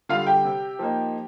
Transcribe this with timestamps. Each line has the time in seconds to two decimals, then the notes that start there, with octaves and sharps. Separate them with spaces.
0.09 D3 G3 F4 F5
0.27 G4 G5
0.44 C3
0.79 F3 A#3 D#4